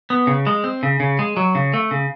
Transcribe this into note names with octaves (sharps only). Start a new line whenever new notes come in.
B3
C#3
G#3
C4
C#3
C#3
G#3
F#3
C#3
A3
C#3